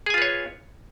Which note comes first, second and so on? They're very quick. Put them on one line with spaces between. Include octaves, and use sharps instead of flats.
G#4 G#5 F4 B4 C#5